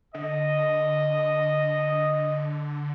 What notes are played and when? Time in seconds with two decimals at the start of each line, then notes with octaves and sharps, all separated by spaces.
0.14 D3 D#5